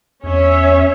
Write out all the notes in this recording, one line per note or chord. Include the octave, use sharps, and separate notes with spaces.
E2 C#4 C#5 E5